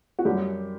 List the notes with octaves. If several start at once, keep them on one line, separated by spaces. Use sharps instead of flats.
F#4
F#2 G3 G4